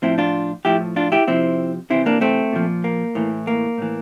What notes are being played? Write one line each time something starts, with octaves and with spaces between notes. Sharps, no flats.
A2 F3 C4 E4
D4 F4
A2 F3 E4 G4
D4 F4
E4 G4
C3 F3 C4 E4
C3 E3 C4 E4
A#3 D4
A3 C4
A#2 F3
A#3
A2 E3
A#3
A2 E3